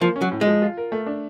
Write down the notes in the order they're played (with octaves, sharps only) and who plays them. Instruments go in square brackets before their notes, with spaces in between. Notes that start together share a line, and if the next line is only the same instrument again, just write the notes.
[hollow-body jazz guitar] F3 [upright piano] A#3
[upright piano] C#4
[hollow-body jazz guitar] F#3
[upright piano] A2
[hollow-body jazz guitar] G#3
[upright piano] F3
F4
A#4
A3
D4